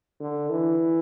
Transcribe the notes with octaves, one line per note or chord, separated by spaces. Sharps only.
D3
E3